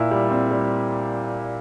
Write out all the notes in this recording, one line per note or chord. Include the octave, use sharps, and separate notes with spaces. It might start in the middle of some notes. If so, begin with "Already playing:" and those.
Already playing: A#2 E4
G3
C4
G3